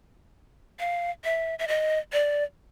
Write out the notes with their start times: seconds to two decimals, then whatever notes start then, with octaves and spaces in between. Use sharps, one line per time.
0.80 F5
1.24 E5
1.59 E5
1.68 D#5
2.13 D5